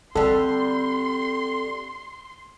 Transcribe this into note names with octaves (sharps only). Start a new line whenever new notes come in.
D3 G3 C4 A4 C6